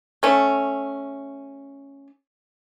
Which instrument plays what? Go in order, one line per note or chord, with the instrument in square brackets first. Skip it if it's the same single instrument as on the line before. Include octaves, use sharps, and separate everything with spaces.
[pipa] A3 C#4